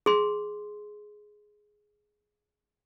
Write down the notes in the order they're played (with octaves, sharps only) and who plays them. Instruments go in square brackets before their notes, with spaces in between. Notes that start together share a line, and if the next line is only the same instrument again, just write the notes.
[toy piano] G#4 C6